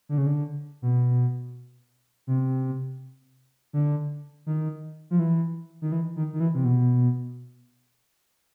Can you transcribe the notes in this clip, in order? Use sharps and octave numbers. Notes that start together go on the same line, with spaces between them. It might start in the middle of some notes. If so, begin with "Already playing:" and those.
D3
C#3
D3
B2
C3
D3
D#3
F3
E3
D#3
E3
D#3
D#3
E3
C3
B2